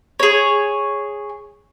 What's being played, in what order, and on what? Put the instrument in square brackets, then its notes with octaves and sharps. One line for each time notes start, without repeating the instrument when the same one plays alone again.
[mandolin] G#4 C#5